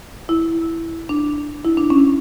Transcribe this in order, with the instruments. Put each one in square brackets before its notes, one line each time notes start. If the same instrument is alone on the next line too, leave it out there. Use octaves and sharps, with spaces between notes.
[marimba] E4
D4
E4
D4
C#4